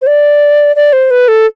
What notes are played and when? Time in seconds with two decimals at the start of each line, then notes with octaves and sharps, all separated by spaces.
0.02 C5
0.07 D5
0.76 D5
0.93 C5
1.11 B4
1.28 A4